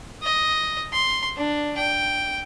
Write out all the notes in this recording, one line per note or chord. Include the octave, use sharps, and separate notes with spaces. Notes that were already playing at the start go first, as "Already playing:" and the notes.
D#5
C6
D4
G5